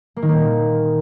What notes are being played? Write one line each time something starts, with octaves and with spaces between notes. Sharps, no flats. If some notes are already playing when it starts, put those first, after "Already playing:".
A#3
D#3
A#3
A#2